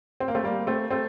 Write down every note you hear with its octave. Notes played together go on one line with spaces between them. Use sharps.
C4
A#3
A3 C4
G3 A#3
A3 C4
A3 C4